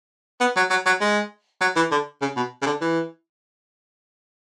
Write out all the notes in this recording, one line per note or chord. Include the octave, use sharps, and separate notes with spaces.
B3
F#3
F#3
F#3
G#3
F#3
E3
D3
C#3
B2
C#3
D3
E3